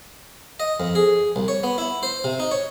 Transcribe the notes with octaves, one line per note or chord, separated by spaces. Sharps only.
D#5
F2
G#4
C2
C#5
B3
E4
C5
C3
D#4
C#5